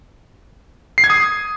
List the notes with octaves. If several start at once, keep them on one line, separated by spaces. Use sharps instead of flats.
C7
G#6
D#6